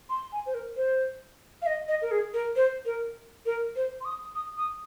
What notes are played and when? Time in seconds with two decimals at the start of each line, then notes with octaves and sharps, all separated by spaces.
0.09 C6
0.32 G#5
0.46 C5
0.54 A#4
0.76 C5
1.62 F5
1.66 D#5
1.88 D#5
2.02 A#4
2.11 G#4
2.34 A#4
2.56 C5
2.86 A#4
3.46 A#4
3.76 C5
4.01 C6
4.05 D#6
4.35 D#6
4.57 D#6